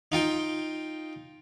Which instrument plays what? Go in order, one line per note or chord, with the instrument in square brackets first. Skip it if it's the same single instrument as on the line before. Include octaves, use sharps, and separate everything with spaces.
[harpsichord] D#4 F4 G5